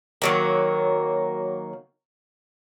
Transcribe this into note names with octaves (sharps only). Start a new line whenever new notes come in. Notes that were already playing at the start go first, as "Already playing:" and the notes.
D#3 F#3 A#3